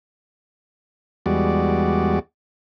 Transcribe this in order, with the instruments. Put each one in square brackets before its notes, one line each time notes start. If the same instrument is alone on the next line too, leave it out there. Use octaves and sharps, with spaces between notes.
[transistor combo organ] E2 G3 G#3 F#4 D5